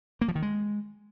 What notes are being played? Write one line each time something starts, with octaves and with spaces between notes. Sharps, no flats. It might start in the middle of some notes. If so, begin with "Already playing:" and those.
A#3
F3
D#3
G#3